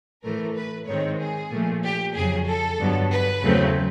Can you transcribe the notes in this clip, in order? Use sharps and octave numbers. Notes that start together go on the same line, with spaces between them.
A2 E3 A3 A#4
B4
G#2 D#3 G#3 C4 C#5
G#4
A#2 F3 A3
G4
F2 C#3 F#3 G#4
A4
G2 D3 F#3 B3
B4
E2 C#3 F#3 A3 C4